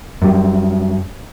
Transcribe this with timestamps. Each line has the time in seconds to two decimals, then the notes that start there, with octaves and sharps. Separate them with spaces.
0.22 F#2 G3